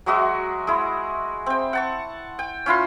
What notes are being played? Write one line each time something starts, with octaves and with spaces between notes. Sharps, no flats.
F#3 G#3 F#4 E5
G#3 E4
C4 G5
F#5 A5 C#6
G5
C#4 E4 F4 C6